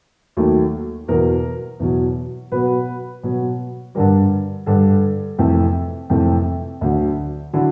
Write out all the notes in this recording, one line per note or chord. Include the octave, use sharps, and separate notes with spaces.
D#2 D#3 F#3 A3
E2 B2 F#3 A#4
E2 B2 F#3
B2 F#3 B3 B4
B2 F#3 B3
G2 D3 G3 A#4
G2 D3 G3 A4
F2 C3 E3 A3
F2 C3 E3 A3
D2 D3 F#3
D3 F#3 E4